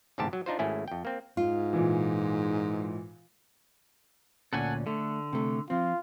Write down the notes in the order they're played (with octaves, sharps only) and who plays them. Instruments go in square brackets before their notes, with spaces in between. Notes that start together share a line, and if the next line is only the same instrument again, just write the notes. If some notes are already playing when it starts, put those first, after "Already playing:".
[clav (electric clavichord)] G1 E2 G#2 C3 G4 A5
F#3
D4 D#4 F4 C5
G#1 A3 C#4 E4 G#4
F2 G5
A#3 C4
[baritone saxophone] G#2 [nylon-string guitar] F4
[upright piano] A#2 E3
[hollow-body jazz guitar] D2 A#2 C#4 [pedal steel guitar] A4 F#5 G#5
[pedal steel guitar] D3 [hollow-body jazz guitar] A3
[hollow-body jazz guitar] C3 A3
[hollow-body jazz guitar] F3 C4 [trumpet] F4